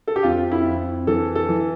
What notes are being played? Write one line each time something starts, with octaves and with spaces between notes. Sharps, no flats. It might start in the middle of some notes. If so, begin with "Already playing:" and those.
A4
G4
F2 F4
E4
F2
E3 A4
A4
E3